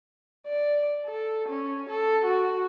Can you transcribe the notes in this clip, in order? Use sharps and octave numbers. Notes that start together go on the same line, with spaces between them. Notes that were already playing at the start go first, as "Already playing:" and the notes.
D5
A4
C#4
A4
F#4